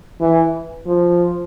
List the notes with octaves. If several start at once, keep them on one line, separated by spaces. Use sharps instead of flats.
E3
F3